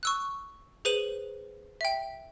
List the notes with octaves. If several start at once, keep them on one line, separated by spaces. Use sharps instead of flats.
C#6 E6 F#6
G#4 B4 C5 D#7 F#7
E5 G5